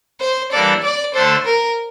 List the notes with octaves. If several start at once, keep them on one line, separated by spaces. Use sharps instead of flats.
C5
E3 G3 A#3 D4 A4 D5
D5
D3 A3 D4 A4 C5
A#4